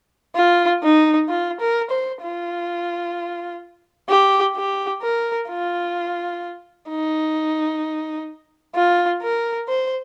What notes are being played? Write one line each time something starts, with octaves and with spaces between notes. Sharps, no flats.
F4
D#4
F4
A#4
C5
F4
G4
G4
A#4
F4
D#4
F4
A#4
C5